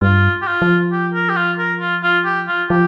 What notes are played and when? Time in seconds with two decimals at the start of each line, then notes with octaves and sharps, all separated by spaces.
0.02 G2 F4
0.42 G4
0.47 F4
0.62 F3
0.92 G4
1.14 A#4
1.29 G4
1.36 F4
1.58 A#4
1.80 F4
2.03 F4
2.25 G4
2.48 F4
2.70 F3 G4